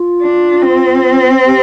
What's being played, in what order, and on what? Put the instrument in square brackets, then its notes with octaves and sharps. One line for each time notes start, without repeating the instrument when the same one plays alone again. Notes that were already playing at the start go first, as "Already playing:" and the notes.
Already playing: [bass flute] F4
[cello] D4
C4
[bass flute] G4